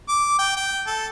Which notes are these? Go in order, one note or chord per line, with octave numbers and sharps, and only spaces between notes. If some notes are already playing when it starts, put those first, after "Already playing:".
D6
G5
G5
A4